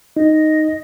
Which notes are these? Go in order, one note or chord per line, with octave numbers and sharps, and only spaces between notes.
D#4 D#5